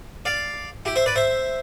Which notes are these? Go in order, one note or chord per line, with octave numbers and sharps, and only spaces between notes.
D5 F5
E4 G4
C5 E5
B4 D5
C5 E5